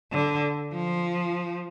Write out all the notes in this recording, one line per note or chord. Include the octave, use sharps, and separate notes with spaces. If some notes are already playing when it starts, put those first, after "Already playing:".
D3
F3